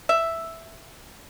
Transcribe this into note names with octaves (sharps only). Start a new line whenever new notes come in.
E5